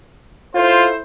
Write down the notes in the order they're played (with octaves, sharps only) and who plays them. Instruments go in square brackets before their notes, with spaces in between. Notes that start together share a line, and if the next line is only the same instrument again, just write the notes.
[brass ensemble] E4 A4 C5 [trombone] F4